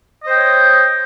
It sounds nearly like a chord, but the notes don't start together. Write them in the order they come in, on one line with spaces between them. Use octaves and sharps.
D#5 C5 G5 C#5